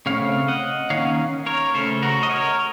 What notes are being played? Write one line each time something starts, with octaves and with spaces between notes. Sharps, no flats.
C#3 A3 C4 C#5 F5
D#5 F#5
D#3 A#3 C#4 C#5 F5
A#4 C#5
C#3 A3 C#4 A4 C5
F#4 A#4
D#5
A#4 C#5